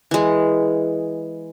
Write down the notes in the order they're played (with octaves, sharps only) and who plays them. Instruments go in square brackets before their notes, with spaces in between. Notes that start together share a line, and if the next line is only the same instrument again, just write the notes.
[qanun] E3 G#3